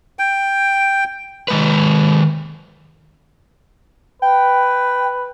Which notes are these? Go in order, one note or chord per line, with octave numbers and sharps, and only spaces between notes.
G5
D#3 G#3 B4
B4 G5